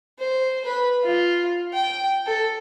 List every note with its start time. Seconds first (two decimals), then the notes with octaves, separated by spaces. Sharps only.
0.19 C5
0.65 B4
1.03 F4
1.74 G5
2.27 A4